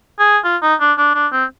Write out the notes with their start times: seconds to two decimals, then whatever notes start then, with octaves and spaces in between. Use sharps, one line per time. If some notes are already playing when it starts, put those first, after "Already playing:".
0.19 G#4
0.44 F4
0.62 D#4
0.81 D4
0.98 D4
1.15 D4
1.32 C4